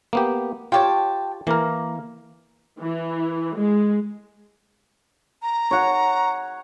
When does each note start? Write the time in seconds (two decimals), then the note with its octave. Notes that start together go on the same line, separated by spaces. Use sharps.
0.13 A#3 B3 G4
0.72 F4 G4 C#5 G5 A5
1.47 E3 A#3 A#4
2.80 E3
3.56 G#3
5.42 A#5
5.71 C#5 F#5